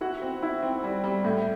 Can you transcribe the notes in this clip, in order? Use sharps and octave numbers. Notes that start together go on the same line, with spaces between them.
E4 F#4 F#5
C4
E4
C4
G3
G3
A2